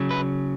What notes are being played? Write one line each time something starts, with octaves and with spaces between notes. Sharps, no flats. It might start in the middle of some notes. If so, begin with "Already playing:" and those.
Already playing: C#3 F#3
B4